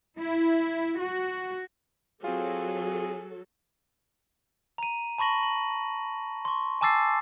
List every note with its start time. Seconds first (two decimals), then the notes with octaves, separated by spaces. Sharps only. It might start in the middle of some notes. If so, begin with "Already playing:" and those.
0.18 E4
1.00 F#4
2.24 F#3 C4 F4 G#4 A4
4.78 A#5 D#7
5.18 A5 B5 C#6 A#6 F#7
5.43 F#7
6.45 C6 C#6
6.81 G#5 A5 D6 E6 A6 C7